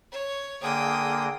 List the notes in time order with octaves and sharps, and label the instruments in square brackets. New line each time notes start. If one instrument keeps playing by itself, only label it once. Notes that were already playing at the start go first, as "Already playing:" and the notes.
[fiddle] C#5
[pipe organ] D3 A#3 G#4 [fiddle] G5 D#6